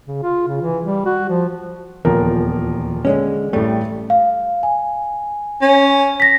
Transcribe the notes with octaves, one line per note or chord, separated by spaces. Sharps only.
C#3
F4
C#3
E3
G3
F#4
F3
D#1 E2 F3 A#4
D3 G#3 C#4
A1 G3 A3
F5
G#5
C#4
A#6 B6